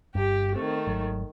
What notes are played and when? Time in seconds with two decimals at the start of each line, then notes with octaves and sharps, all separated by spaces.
0.15 G1 G2 G4
0.55 D#3 A3 C4
0.87 G#1 F#3